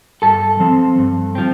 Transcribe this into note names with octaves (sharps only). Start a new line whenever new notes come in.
G2 A4 A5
F3 C4
G2
F3 C4